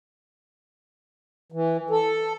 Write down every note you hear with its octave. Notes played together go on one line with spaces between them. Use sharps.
E3
A4